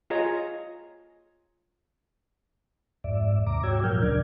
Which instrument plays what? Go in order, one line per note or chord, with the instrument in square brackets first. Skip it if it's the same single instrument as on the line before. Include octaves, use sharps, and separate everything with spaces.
[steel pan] F4 G#4 C#5 D#5 G#5 A#5
[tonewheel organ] F2 G#2 D5 E5
D#2 C3 A#5 D6
G#2 F#4 C#5 G5 E6 G#6
A#2 F3 F#3 A#4 F6 G6
D2 A#2 C#3 D4 D5 G#6